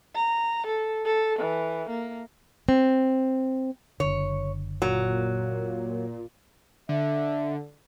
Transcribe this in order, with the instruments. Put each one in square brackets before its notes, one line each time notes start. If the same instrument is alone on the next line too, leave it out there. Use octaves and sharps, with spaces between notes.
[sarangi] A#5
A4
A4
E3
A#3
[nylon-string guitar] C4
[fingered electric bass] F#1 D3 [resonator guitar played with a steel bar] C#5
[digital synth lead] A#2 [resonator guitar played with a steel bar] F#3
[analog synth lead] D3 [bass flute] E5